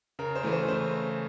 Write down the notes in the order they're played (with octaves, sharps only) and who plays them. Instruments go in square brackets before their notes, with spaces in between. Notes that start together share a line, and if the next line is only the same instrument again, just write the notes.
[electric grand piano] C#3 [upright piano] A#4
[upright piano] C5
[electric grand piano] E3 A3 [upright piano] B4
[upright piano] C5
[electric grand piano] C#3 [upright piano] C5